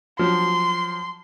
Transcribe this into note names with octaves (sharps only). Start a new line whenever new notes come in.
F3 F#3 C6